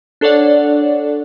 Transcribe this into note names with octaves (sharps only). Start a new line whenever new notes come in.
D4 A4 C#5 D5 F#5